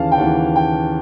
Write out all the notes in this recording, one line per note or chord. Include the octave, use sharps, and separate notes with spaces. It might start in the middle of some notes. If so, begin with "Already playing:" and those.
Already playing: D#2 C#3 E3 F5 A5
G5
D#2 C#3 E3 F#5
G5